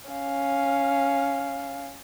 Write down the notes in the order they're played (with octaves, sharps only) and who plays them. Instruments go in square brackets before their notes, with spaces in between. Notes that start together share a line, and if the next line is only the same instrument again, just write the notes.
[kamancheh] C#4 F5